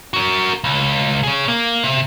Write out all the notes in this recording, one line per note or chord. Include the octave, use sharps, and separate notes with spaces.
F#4 A#4
C#2
G#4 C#5
A#3
C3